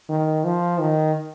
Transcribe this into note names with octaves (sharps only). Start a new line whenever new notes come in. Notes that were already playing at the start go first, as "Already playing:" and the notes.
D#3
F3
D#3